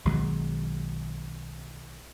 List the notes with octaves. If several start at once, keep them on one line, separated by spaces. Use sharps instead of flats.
B1 D#3 F#3 G#3